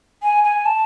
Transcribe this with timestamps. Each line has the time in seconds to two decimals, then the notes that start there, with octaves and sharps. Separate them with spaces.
0.23 G#5
0.44 G#5
0.65 A5